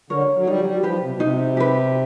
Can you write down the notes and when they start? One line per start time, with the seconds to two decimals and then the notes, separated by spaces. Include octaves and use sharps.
0.10 D3 A#4 C#5
0.36 F#3
0.47 G3 D#4
0.59 F#3
0.65 G3
0.83 F3 G4 B4
1.01 C3
1.12 B2
1.20 C3 D#4
1.57 G4 B4